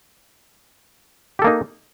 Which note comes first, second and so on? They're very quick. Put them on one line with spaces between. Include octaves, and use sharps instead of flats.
G4 A4 A#3 D#4